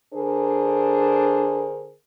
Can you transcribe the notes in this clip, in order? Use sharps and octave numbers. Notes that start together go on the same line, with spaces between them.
D3 D4 G#4 A#4 C5